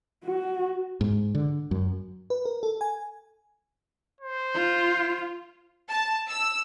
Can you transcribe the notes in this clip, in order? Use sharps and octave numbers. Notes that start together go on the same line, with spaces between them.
F#4
G#2
D3
F#2
B4
A#4
A4
G#5
C5
F4
A5
E6